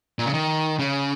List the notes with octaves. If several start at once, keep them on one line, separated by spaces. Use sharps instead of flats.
A#2
C#3
D#3
C#3